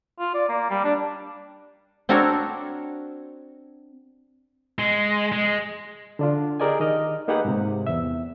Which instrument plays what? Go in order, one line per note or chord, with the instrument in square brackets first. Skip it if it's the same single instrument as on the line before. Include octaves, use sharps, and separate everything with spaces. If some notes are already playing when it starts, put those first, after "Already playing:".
[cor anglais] F4
D5
A#3
G3
D4
[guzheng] C4 D4 F#4 A4 A#4 C#5
[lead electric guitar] G#3
G#3
[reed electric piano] D3 D4 F4
G4 G#4 A#4 D5 D#5 G#5
D#3 D#5 F6
A#3 D#4 G4 G#4 B4 F#5
G#2 C3
E2 E5